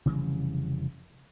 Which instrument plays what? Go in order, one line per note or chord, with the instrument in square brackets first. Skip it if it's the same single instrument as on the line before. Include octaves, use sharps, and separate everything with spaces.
[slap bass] F1 C#3 E3 G3